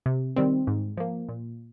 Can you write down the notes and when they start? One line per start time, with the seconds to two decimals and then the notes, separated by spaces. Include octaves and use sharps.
0.06 C3
0.36 D#3 G3 C4
0.67 G#2
0.97 F3 A#3
1.29 A#2